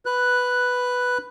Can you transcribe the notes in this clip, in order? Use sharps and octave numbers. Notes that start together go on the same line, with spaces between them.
B4 F#6